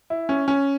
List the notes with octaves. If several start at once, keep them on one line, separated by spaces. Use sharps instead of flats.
E4
C#4
C#4